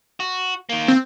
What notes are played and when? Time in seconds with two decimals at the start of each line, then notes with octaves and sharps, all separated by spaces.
0.20 F#4
0.69 D#3 A#3
0.88 C4